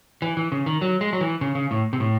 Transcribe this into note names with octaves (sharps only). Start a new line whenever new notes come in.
E3
E3
C#3
D#3
F#3
G#3
F#3
E3
C#3
C#3
A2
C3
A2